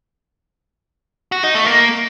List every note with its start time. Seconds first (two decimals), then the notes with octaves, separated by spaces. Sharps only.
1.32 F#4
1.43 D#4
1.55 A3
1.66 A#3